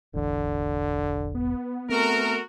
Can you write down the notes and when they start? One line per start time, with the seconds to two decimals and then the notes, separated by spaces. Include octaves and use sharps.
0.14 E1 A1 E2 D3
1.35 B3
1.89 A3 C4 F#4 A#4